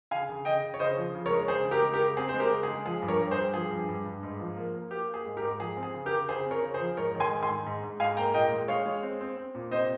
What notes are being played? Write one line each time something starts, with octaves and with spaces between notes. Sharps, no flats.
C#3 F5 G#5
C#3
C#3 D#5 G5
C#3
C#5
C#3 C5 D#5
F3
C#3
A#4 C#5
G#3
C#3 G#4 C5
C#3
G4 A#4
G#3
G4 A#4
C#3
C4 G#4
C5
G#3
G4 A#4
C#3
G#4
G#3
F3 G#4
G2
A#4 C#5
G2
G#4 C5
G2
F3 G#4
G2
G2
G2
G#2
F3
A#3
A#3
A#3 G4
A#3
G#4
G#2
G4 A#4
G#2
F3 G#4
C4
G#4
C#3
G4 A#4
C#3
C#3 G#4 C5
C4
A#4 C#5
C#3
G#4 C5
F3
G#2 A#4 C#5
D#3
G#5 C6
G#2
G#5 C6
G#2
G#2
G#2
G#2 F5 G#5
A#3 G5 A#5
A#2 D#5 G5
G#3
G#3 C#5 F5
G#3
C4
C4
C4
A#2
C3 C5 D#5